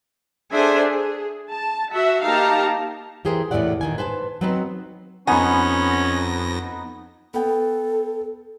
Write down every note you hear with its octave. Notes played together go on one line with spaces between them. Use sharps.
D4 G#4 A4 C5 E5 G#5
G#4
A5
F#4 E5
A#3 D#4 G4 F5 A5 A#5
E3 G4 G#4 A#4 C5
E2 A2 E3 E4 D5 F#5
A#2 D#3 G#5
B4 C5 G#5 A5
F#3 B3 C4 D#4 B4 C5
F2 B3 C#4 D#4 G#5 A#6
B3 A4 G5